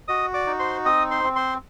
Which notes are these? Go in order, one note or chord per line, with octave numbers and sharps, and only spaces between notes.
F#4 D#5 D#6
D5 D6
D#4
C5 C6
C4 D#5 D#6
C5 C6
C4
C5 C6